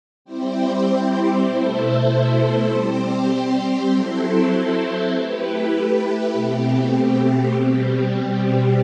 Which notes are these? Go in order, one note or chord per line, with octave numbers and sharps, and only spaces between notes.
G3 C4 E4 G4 C5
B2 A3 E4 A4 C5
G3 C4 G4 C5
F#3 C4 E4 A4 C5
A3 E4 G4 B4
B2 A3 C4 G4
B2 G3 C4 G4